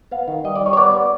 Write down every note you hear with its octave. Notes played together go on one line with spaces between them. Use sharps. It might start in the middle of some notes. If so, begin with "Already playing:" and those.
B3 F5
D#3
G3 D#5
D5
G3 C#5
C#5
B3 D5
B3